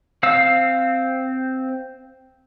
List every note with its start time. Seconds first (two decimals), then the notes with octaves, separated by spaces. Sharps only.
0.23 C4 F5 E6